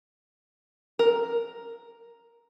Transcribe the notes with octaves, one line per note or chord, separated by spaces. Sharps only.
A#4